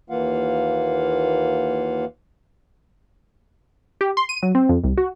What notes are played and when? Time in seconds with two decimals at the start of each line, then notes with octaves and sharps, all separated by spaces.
0.10 D#2 E3 A#3 F4 F5 F#5
4.01 G4
4.17 C6
4.29 D#7
4.43 F#3
4.55 C4
4.69 F2
4.84 C2
4.98 F#4